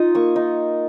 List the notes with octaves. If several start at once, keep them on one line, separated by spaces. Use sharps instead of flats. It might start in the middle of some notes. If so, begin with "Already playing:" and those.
Already playing: D#4 F4 D#6
A#3 C#6
D#4